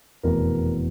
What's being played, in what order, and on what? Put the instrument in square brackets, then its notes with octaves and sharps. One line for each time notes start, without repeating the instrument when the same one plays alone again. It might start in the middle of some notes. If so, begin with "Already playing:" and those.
[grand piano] F1 E2 B2 A#4